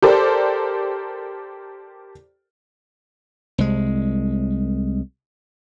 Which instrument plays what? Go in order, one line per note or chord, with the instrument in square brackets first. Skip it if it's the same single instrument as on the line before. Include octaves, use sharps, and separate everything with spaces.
[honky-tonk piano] G4 A4 A#4 C5 D5
[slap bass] C2 G#3